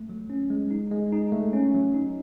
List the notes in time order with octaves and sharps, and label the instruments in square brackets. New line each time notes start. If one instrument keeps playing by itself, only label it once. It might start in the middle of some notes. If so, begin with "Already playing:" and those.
Already playing: [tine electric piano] A3
F#3
C#4
G#3
D#4
G#3
D#4
A3
C#4
F#3
D#4